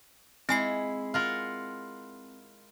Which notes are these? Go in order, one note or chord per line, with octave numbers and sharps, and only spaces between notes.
G#3 C4 E4 G#5 C7
F4 A#4 F#5